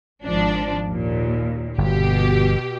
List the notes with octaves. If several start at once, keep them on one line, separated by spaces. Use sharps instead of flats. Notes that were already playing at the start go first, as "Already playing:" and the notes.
G#1 F3 D4
D#2 A#2
G1 B2 G4